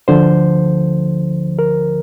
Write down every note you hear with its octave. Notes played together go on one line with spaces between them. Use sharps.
D2 D3 F3 C5
A#4